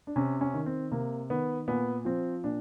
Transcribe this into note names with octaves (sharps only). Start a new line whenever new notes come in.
D4
C3 C#4
C#4
D#3
C4
C3 A#3
D#3 B3
A#2 B3
F3 C4
A#2 D4